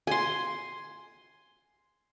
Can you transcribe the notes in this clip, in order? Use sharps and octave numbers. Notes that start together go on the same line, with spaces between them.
G#5 C6